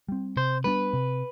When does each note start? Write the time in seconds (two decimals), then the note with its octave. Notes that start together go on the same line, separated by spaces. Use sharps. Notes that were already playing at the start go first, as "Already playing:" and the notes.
0.08 G3 C4
0.37 C3 C5
0.64 G3 B3 D4 B4
0.93 C3